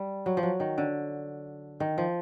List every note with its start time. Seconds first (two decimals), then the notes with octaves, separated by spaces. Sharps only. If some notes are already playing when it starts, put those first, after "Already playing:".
Already playing: G3
0.26 F#3
0.37 F3
0.43 F#3
0.60 D#3
0.78 D3
1.80 D#3
1.98 F3